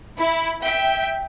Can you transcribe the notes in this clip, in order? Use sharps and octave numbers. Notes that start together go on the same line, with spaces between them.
E4
E5 G5